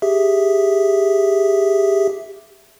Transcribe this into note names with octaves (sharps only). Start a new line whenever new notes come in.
G4 G#4 E5